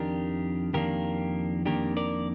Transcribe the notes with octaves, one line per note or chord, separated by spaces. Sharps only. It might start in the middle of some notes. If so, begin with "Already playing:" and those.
Already playing: F2 D#3 D4 G4 A#4
F2 D#3 A#3 D4 G4 A#4
F2 D#3 A#3 D4 G4 A#4
A#4 D5